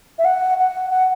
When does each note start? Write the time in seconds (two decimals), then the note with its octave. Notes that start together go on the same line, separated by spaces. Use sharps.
0.19 E5
0.25 F#5
0.58 F#5
0.91 F#5